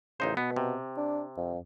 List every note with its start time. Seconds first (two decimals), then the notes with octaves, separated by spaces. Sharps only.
0.20 A1 C#3 D#4 C5
0.37 B2 B3
0.56 C3
0.97 D4
1.37 F2